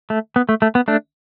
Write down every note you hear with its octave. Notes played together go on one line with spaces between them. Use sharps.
A3
B3
A3
A3
B3
A3 D4